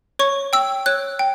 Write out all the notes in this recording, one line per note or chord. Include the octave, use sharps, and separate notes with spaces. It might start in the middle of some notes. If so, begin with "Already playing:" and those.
C#5 C#6
G5 E6
C#5 F#6
G5